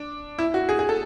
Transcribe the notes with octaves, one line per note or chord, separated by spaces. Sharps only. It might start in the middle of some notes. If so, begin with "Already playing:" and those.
Already playing: D4
E4
F#4
G#4
G#4
A4